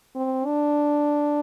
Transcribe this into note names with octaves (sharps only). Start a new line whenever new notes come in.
C4
D4